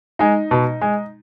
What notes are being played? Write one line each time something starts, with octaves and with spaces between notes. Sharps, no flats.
G#3 D#4
B2
G#3